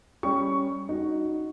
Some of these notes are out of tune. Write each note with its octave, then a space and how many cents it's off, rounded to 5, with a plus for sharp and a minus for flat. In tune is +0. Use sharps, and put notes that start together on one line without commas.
G3 +0 C#4 +0 C#6 +10
D#4 +0 F#4 +0